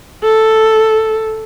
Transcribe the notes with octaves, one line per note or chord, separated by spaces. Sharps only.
A4